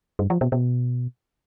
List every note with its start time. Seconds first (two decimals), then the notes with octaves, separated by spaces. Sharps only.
0.19 G2
0.30 F3
0.41 B2
0.52 B2